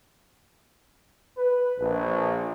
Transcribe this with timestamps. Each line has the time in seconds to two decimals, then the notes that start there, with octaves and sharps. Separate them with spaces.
1.37 B4
1.79 A#1